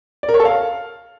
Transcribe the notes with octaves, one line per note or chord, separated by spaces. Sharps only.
D5
A#4
C#5
A4
F5